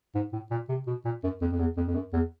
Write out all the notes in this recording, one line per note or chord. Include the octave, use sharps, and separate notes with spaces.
G#2
A2
A#2
C3
B2
A#2
F#2
F2
F2
E2
F2
F2
F#2
E2